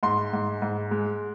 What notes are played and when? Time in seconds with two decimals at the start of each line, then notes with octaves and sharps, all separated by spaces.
0.03 G#2 C6
0.33 G#2
0.62 G#2
0.91 G#3